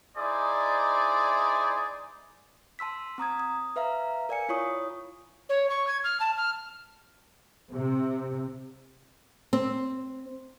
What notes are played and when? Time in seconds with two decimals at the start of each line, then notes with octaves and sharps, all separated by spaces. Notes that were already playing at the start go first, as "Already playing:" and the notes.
0.16 D#4 E4 G#4 C5 D5
2.79 A5 C6 E6 B6
3.18 C4 A#5 D#6 G#6
3.40 D#6
3.76 B4 E5 F5 A#5
4.29 A#4 D5 F5 G#5 C#7
4.49 E4 F4 C#5 C#6 D#6
5.49 C#5
5.70 C#6
5.87 G#6
6.04 F6
6.20 A5
6.37 F6
7.72 C3
9.53 C4